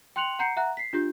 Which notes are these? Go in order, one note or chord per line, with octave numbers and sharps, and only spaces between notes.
G5 C6 F#6 C#7 F7 F#7
F#5 A#5 G6 C7 C#7
E5 F#5 A#5 F#6
B6 C7
D4 F4 G4 G6